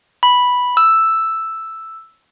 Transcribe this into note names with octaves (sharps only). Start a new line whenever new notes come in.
B5
E6